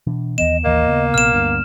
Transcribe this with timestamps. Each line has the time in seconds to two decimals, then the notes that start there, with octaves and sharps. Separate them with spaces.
0.07 B2 E3 D4
0.38 D#2 E3 B3 D#5 E7
0.65 A1 D#2 E3 A#3 D#5
0.87 D#2 C#3 B3
1.14 A#1 C3 B3 F6 E7
1.34 D2 G2